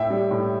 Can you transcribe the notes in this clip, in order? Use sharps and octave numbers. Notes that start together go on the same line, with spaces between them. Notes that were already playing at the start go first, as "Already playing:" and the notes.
Already playing: A2 E5 G5
G3
A2